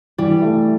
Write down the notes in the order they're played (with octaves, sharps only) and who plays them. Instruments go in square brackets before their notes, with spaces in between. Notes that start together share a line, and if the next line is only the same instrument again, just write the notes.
[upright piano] E3 [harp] G3
[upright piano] A3